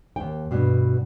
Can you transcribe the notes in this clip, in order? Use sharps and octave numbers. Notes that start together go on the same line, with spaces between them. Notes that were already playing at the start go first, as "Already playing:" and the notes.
D#2 G5
G2 B2